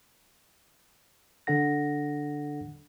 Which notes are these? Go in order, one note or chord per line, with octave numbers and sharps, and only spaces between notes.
D3 D4 A4 F#5 A#6